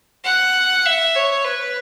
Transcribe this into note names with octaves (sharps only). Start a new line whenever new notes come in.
F#5
E5
C#5
B4